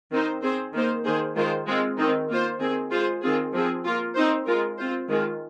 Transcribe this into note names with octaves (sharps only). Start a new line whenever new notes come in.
D#3 C4 D#4 C5
C4 G#4 C5
D#3 A#3 D#4 C5
D#3 A#3 G#4 C5
D#3 G#3 F4 C5
G#3 C4 F4
D#3 C4 D#4
A#3 F4 C5
D#3 C4 G#4
G#3 F4 G#4 C5
D#3 C4 F4 G#4
F3 C4 G#4
A#3 F4 A#4
C4 D#4 C5
G#3 F4 A#4
C4 F4 C5
D#3 G#3 F4